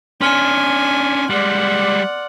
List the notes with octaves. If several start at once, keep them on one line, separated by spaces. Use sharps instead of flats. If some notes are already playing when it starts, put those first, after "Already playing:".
C#4 D4 G#5 C6 F6 G7
G3 G#3 D5 F#5